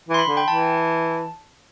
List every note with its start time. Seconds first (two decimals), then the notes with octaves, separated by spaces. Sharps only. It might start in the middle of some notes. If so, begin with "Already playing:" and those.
0.09 E3
0.14 C6
0.19 B5
0.28 D3
0.37 G5
0.48 E3 A5